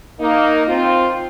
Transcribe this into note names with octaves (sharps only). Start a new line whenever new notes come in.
A#3 D#4
C4 F4